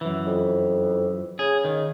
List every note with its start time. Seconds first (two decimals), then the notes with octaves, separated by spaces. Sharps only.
0.01 F#2 E3
0.26 F2
1.39 C#3 G#4
1.65 D#3